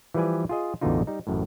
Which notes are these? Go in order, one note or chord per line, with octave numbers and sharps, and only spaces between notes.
E3 F3 G3 B4 D5 G#5
F4 G#4 D#5
A1 E2 B2 D3 D#4 F4
G3 D#4
A1 F#2 A2